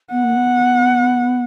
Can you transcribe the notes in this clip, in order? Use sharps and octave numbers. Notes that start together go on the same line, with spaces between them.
B3 F#5
A#3
B3